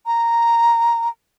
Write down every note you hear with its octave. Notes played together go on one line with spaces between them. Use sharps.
A#5